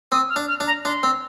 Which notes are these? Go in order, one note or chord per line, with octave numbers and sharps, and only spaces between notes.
C4 D#6
F6
D4
F6
D4
A#5
D4 C6
C4